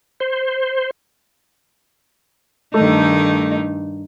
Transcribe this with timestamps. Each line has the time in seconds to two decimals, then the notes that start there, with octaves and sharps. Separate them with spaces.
0.20 C5
2.74 G2 D#3 A3 D#4